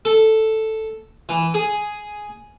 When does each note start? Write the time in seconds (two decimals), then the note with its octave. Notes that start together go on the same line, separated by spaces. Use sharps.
0.05 A4
1.29 E3
1.54 G#4